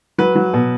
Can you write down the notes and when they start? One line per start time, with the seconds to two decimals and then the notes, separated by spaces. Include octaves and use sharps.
0.18 F#3 B4
0.35 F#3
0.53 B2